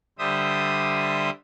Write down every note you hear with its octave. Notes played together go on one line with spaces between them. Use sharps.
D3 G3 C5 E5 D#6